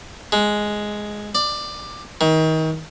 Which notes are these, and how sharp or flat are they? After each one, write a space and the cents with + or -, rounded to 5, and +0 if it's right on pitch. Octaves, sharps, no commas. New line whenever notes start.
G#3 +5
D5 +15
D#3 +30